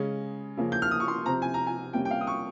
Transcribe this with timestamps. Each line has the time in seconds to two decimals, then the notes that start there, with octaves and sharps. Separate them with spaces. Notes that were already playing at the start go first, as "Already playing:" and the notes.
Already playing: C#3 G#3 C#4
0.57 C#3 F3 A#3 C#4
0.72 G6
0.82 F6
0.91 D#6
1.00 C#6
1.08 C6
1.25 C3 F3 C4 A#5
1.42 G#5
1.54 A#5
1.67 G#5
1.93 C3 G3 A#3 C#4 G5
2.05 G5
2.11 F5
2.21 D#6
2.27 C#6